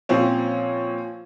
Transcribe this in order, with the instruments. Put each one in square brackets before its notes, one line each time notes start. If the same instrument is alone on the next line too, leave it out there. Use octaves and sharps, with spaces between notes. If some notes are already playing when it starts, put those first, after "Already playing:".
[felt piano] A#2 F3 C4 C#4